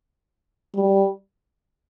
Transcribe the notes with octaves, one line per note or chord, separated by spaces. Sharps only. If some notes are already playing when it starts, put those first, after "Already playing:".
G3